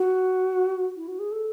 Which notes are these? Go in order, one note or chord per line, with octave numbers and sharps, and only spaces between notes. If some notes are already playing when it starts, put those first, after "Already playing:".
Already playing: F#4
E4
F#4
G#4
A4